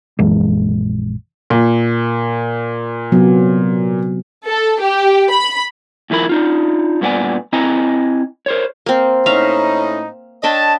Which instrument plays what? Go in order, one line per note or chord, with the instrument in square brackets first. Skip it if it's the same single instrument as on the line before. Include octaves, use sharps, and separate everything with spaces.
[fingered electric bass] A#1 F#2 E3 G#3
[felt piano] A#2
[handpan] C3 F#3 B3
[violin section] A4
G4
B5
[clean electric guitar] D#2 F3 E4 A#4 B5
D4 D#4 F4
G2 A#2 B3 E4 D5 G#5
C4 E4 D#5 G#5 A#5
A#4 C5 C#5
[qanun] A#3 C4
[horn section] A2 C#4 D#4 [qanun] E5 F5 A#5
[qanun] D4 E5 G5 [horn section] C#5 D#5 A5